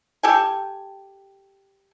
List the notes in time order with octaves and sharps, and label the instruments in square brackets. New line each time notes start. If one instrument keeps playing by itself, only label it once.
[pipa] G4 A4 G#5